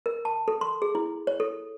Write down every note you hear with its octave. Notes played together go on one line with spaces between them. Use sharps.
A#4
A5
A4
C6
G#4
E4
C#5
A4